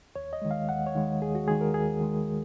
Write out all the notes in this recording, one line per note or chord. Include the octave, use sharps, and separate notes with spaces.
D#2 C#5
D#5
D#3 G#3
F5
D#2 F#5
C#5
D#3 G#3
D#2 G#4
F#4
D#3 G#3 G#4
A#4
D#2 G#4
D#3 G#3